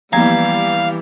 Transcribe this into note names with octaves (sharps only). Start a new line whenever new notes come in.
E3 F3 G3 A#3 B3 F5 A#5 G#6